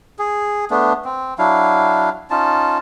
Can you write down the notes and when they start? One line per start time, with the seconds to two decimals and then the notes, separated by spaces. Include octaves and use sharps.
0.19 G#4
0.70 A3 B3 D4
1.05 C4
1.39 F#3 D4 E4 F5
2.30 C#4 D#4 F4 A5